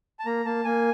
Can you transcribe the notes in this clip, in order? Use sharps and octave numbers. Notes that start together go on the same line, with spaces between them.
A5
A#3 A#5
A#3 A5
A#3 G#5